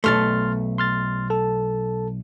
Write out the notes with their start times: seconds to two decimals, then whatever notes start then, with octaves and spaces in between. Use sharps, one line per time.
0.04 B1 G#2 A3 C6 F6 A6
0.78 C6 F6 A6
1.30 A4 A5